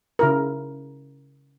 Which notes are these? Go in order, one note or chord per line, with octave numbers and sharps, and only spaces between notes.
C#3 E4 A#4